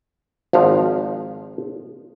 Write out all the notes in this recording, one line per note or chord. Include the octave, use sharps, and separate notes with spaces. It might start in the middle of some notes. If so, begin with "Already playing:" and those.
G#1 F3 F5